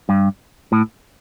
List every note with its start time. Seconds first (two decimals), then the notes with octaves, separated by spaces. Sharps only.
0.09 G2
0.72 A2